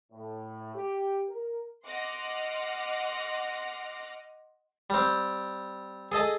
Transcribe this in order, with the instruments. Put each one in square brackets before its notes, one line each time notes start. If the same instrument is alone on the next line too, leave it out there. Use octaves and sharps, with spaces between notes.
[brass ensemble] A2
G4
A#4
[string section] D#5 F#5 C6 D6 F6 A#6
[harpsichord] G3 C4
G#4 A4 D#5 A5